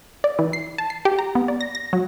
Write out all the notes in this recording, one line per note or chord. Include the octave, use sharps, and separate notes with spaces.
D5
E3
C7
A5
C7
G4
A#5
B3
D5
A#6
A#6
F#3